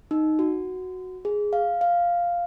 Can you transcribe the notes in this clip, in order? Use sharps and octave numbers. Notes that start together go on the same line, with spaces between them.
D#4
F#4
G#4
F5
F5